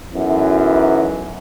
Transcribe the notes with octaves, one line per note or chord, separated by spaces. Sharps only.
B1 F#2 E3